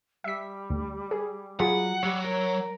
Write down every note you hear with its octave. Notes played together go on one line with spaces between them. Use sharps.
G3 E5 B6
D2
G#4
F#3 F4 G#4 F#5 B5
F#3 G3 C#5 F#5
A#4 C#5